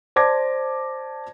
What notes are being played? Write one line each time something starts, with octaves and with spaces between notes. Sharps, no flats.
C5 D5 A5 D6 G#6 A#6